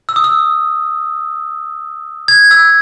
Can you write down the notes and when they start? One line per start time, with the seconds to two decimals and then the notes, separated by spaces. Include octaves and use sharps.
0.09 E6
0.16 D#6
0.24 E6
2.28 G#6
2.51 E6